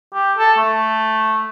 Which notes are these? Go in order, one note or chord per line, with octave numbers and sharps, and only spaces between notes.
G4
A4
A3